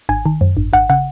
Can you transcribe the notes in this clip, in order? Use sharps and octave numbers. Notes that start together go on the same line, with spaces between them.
G#1 G#5
D#3
F#2
G#1
G#1 F#5
C#3 F#5